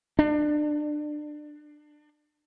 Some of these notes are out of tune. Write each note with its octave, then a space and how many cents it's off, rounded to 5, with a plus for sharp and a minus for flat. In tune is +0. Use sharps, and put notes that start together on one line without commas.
D4 +25